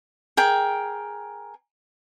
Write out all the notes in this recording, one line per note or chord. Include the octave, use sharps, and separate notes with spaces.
G#4 A#4 G5